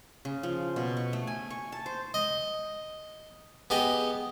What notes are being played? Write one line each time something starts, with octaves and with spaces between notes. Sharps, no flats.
C#3
F3
B2
C#6
A3
G#5
C#6
A5
C5
D#5
B3 G4 G#4 D#5